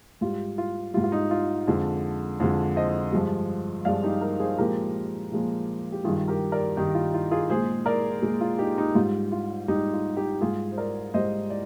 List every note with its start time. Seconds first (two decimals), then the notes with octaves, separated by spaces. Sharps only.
0.21 G#2 G3 F4
0.58 F4
0.94 G3 F4
0.97 G#2
1.04 F4
1.12 D#4
1.31 F4
1.68 F2 D3 G#3
2.40 F2 D3 G#3
2.76 C5 D#5
3.13 G2 F3 G#3
3.85 G2 F3 G#3 D5 F5
4.04 D#4 G4
4.21 G4 A#4
4.40 G#4 C5
4.58 A#2 F3 G#3 G4 A#4
5.32 A#2 F3 G#3
5.92 G4
6.04 G2 D#3 G3 F4 G#4
6.28 G4 A#4
6.52 A#4 D5
6.77 G2 D#3 G3 D#4
6.95 F4
7.14 F4
7.31 F4 G#4
7.50 A#2 G#3 G#4 C5
7.86 A#4 D5
8.23 A#2 G#3
8.41 F4
8.58 D#4 G4
8.78 D#4 G4
8.95 G#2 G3 F4
9.32 F4
9.68 G#2 G3 D#4 G4
9.93 F4
10.17 D#4 G4
10.41 G#2 G3 F4 G#4
10.72 C5
10.78 A#4 D5
11.14 G#2 G3 C5 D#5
11.50 D5